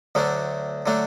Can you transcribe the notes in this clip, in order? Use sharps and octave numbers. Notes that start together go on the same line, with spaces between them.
D2 D3 F#3 A3 D4
D3 F#3 A3 D4